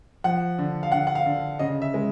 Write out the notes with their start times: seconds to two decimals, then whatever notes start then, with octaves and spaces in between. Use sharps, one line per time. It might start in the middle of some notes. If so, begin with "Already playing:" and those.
0.24 F3 F#5
0.58 D3
0.83 F5
0.92 D3 F#5
1.07 F#5
1.15 F5
1.26 D3
1.59 C#3 D#5
1.82 E5
1.94 G#3